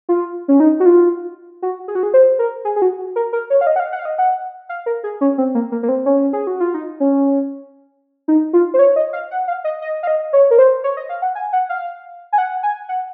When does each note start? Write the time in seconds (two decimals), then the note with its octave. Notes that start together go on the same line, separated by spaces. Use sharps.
0.09 F4
0.48 C#4
0.60 D#4
0.80 F#4
0.86 F4
1.62 F#4
1.88 G#4
1.95 F#4
2.03 G#4
2.14 C5
2.39 A#4
2.65 G#4
2.76 G#4
2.82 F#4
3.16 A#4
3.33 A#4
3.50 C#5
3.61 F5
3.67 D#5
3.76 F#5
3.80 F5
3.92 F#5
3.99 F5
4.05 D#5
4.18 F#5
4.69 F5
4.86 A#4
5.04 G#4
5.21 C#4
5.38 C4
5.55 A#3
5.72 A#3
5.83 A#3
5.89 C4
6.06 C#4
6.33 G#4
6.47 F#4
6.60 F4
6.74 D#4
7.00 C#4
8.28 D#4
8.53 F4
8.74 C5
8.79 C#5
8.96 D#5
9.13 F5
9.31 F#5
9.48 F5
9.64 D#5
9.82 D#5
10.03 F5
10.07 D#5
10.33 C#5
10.51 A#4
10.58 C5
10.84 C#5
10.97 D#5
11.09 F5
11.22 F#5
11.35 G#5
11.53 F#5
11.69 F5
12.33 G#5
12.38 F#5
12.63 G#5
12.89 F#5